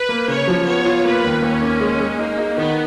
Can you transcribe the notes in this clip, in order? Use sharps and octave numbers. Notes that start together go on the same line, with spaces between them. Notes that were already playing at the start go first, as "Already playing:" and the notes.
Already playing: B4
A#3
C#3 C#5
F3
B3 C#5
F4
A#3 B4
D#2
D#2 C#4
A#3
G#3
G#3
A#3 D#4
D#4
D#3 B3